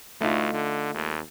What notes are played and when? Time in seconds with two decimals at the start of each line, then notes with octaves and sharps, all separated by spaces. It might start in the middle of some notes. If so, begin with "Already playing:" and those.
0.21 D2 A3 D#4 F4
0.54 D3
0.95 D#2